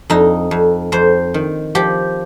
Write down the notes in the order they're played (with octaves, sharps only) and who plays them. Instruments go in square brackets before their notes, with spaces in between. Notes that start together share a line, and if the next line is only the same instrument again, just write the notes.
[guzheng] F2 D#4
F2
F2 C5
D#3
F3 G4